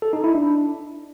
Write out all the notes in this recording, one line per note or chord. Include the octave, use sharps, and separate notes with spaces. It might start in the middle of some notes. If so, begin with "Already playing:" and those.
A4
D#4
E4
D4